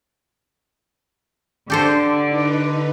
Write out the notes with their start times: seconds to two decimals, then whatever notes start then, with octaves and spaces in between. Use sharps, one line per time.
1.70 D3 G4 A4 C5 D5
2.28 D#4 B4